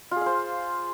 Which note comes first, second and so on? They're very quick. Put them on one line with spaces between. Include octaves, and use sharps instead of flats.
F4 G#4 F5 C5